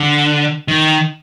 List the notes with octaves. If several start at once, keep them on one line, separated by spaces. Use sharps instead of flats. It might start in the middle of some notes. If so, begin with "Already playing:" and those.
Already playing: D3
D#3